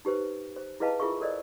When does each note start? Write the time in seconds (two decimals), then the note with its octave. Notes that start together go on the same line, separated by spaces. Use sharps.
0.05 D#4 G4 B4 C5
0.56 C5
0.80 E4 G#4 B4 D#5 F5 A5
1.00 E4 F4 G#4 A#4 E5 C#6
1.21 A4 A#4 C5 D5 D#5